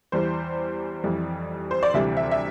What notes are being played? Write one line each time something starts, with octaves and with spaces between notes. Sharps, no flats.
E2 E3 G3 C5
F2 E3 G3
C5
D5
D2 C3 E3 G3 E5
E5
E5